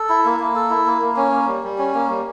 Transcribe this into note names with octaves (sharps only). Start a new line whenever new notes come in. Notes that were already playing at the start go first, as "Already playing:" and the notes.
Already playing: A4
E4
A#3
A#3
A4
E4
A#3
A#3
C#4
A#3
G3
G3
C#4
A#3
G3